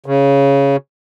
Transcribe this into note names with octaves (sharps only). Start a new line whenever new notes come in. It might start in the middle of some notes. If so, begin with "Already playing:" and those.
C#3